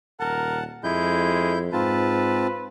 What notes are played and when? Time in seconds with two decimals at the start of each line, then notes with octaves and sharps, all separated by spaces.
0.20 D#1 A#4 F#5 A5
0.84 F2 G#3 E4 G6
1.73 G#2 C4 F4 B4 A5